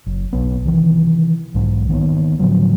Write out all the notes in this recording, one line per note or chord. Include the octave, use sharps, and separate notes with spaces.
F#1
B1 B3
C3 D#3 E3
B1 G#2
D#3 A#3 B3
A2 D3 F3 F#3